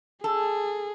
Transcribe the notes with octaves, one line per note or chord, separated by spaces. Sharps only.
G#4 A4